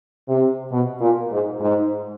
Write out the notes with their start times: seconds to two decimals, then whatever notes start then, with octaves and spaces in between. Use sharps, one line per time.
0.28 C3
0.71 B2
1.01 A#2
1.32 G#2
1.60 G#2